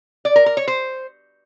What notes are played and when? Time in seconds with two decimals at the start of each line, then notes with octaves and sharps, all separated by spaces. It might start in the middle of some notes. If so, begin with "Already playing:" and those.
0.25 D5
0.36 A#4
0.46 A#4
0.57 C#5
0.68 C5